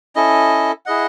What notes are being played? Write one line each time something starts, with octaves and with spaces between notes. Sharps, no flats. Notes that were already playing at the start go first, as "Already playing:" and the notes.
C#4 E4 A4 D#5
E4 G#4 D#5 F#5